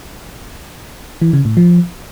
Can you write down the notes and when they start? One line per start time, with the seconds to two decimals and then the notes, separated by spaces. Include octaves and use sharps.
1.22 E3
1.33 C#3
1.45 A2
1.57 F3